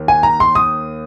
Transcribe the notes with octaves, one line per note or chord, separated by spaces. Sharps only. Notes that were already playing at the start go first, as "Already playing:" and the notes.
Already playing: D#2
G#5
A#5
C6
D#6